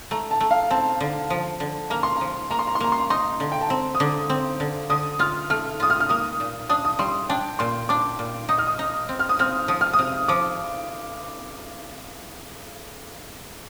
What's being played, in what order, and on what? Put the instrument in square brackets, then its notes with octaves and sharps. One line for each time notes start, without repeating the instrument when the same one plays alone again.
[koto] A3 [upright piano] A#5
[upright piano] A5
[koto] A3
[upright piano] F5
[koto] C4 [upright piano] A5
[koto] D3
F3
D3
[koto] A#3 [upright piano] A#5
[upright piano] C6
[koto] F3 [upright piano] A#5
[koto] A#3 [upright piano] A#5
[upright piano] C6
A#5
C6
[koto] A#3 [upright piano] A#5
[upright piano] C6
A#5
[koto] D#4 [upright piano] C6
[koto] D3
[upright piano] G5
A5
[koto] C4 [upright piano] A#5
[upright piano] D#6
[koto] D3 [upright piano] D6
[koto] C4
D3
[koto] D3 [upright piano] D#6
[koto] F4 [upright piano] F6
[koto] A3 [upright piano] F6
[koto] F4 [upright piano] D#6
[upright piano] F6
F6
[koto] A#3 [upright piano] D#6
[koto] A#2
[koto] D4 [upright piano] D#6
[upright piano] D#6
[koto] G3 [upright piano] C6
[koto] D4 [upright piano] G5
[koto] A#2 [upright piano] C6
[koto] D4 [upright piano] D6
[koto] A#2
[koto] D#4 [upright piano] D#6
[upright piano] F6
D#6
[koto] D#4
C4
[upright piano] F6
D#6
[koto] C4 [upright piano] F6
[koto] F3 [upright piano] D#6
[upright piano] F6
D#6
[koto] C3
[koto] F3 [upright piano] D6